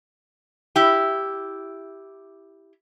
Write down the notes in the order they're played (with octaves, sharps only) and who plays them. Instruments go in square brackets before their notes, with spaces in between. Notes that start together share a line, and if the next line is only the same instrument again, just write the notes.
[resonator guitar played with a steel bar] E4 G4